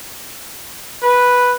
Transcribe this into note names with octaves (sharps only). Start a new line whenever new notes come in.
B4